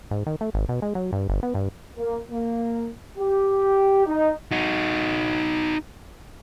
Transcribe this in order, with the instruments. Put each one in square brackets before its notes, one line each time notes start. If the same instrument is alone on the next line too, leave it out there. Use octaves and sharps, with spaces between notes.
[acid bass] G#2
D#3
A3
G#1
B2
G#3
F#3
G2
G1
B3
G2
[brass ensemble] A#3
A#3
G4
D#4
[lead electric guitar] D#4 F#4